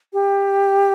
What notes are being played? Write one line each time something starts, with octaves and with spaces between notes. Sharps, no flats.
G4